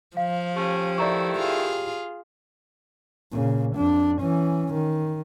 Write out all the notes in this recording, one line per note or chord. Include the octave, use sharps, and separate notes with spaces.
F3 F5
A3 C#4 G4
D#3 A3 E4 D5 A#5 C#6
F4 G#4
A#2 C#3
F2 D4
E3 C#4
D#3